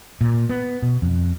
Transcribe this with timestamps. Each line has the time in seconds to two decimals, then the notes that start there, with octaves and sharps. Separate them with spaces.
0.21 A#2
0.49 B3
0.82 B2
1.02 F2